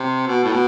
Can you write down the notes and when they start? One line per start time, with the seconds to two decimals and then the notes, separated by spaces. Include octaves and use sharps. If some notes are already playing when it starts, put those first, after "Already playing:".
Already playing: C3
0.27 B2
0.44 A2
0.51 B2